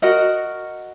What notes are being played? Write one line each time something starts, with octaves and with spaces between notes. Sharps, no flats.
F#4 A#4 D#5 F#5